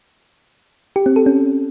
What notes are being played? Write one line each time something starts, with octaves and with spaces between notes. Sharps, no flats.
G4
C4
A4
C#4